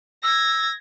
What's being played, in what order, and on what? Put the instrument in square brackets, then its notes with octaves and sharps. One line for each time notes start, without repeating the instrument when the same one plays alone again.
[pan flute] E6 [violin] G#6 A#6